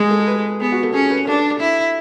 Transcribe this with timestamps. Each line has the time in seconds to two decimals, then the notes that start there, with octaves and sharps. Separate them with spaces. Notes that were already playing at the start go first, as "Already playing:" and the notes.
Already playing: G#3 G#4
0.11 A4
0.27 B4
0.39 B4
0.60 B3 G#4
0.72 F#4
0.83 A4
0.94 C#4 G#4
1.11 B4
1.27 D4 A4
1.60 E4